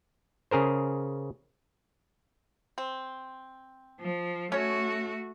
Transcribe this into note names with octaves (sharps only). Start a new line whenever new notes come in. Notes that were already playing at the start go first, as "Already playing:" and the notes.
C#3 G#4 A#4 C5
C4
F3
A3 C#4 F#4 C#5